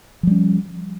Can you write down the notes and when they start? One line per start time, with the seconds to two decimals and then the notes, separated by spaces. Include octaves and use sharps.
0.23 F3
0.27 G3
0.31 C#4